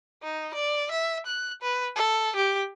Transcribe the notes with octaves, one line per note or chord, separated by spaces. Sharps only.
D#4
D5
E5
F#6
B4
A4
G4